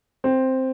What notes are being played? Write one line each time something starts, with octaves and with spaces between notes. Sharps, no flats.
C4